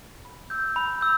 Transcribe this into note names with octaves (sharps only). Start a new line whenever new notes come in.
B5
E6 G6
B5
E6 G6